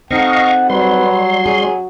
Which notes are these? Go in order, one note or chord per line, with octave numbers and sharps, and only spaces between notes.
C4 D#4 A4 D#5 F5 F#5 C#6
F#3 G3 B4 C6
C#4 G#4